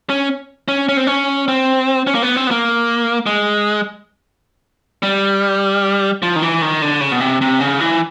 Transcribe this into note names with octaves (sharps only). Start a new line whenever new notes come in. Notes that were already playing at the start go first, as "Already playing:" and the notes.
C#4
C#4
C#4
C4
C#4
C4
C#4
A#3
B3
C4
B3
A#3
G#3
G3
F3
D#3
E3
D#3
D3
C#3
B2
C3
C3
C#3
E3